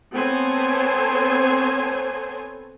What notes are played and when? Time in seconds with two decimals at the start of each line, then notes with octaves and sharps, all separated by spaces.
0.14 B3 C4 A4 C5 C#5 G#5